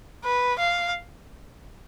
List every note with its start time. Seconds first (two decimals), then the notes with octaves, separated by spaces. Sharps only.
0.24 B4
0.59 F5